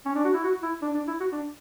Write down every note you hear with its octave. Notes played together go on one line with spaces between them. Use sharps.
C#4
D4
F#4
E4
F#4
E4
D4
D4
E4
F#4
D4